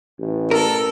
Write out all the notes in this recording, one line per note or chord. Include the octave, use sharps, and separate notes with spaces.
A1
A4 A#4